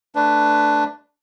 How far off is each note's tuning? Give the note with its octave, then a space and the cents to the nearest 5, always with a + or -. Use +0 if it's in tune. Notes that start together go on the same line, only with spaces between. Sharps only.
A3 +0 D4 +0 B4 +10